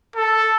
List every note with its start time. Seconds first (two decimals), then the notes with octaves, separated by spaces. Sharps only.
0.16 A4